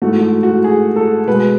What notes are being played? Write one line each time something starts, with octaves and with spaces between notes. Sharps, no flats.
G#2 E3 A3 F#4
F#4
F#4
G#4
A4
B2 G#3 B4